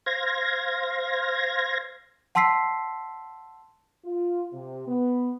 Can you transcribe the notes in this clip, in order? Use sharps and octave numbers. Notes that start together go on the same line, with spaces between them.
C5 F5 G#6 A#6
F#5 A5 C6 E6 B6 C7
F4
C3
B3